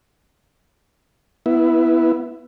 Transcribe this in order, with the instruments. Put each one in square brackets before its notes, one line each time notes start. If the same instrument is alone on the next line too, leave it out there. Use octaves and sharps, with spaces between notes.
[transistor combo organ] B3 E4